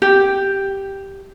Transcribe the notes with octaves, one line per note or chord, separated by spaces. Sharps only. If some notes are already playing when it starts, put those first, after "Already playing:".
G4